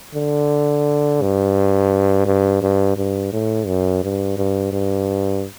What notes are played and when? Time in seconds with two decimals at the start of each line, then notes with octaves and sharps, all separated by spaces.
0.15 D3
1.21 G2
2.26 G2
2.62 G2
2.97 G2
3.33 A2
3.67 F#2
4.03 G2
4.37 G2
4.72 G2